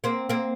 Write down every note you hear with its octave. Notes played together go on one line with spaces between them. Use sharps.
A#3 C4
A#3 C4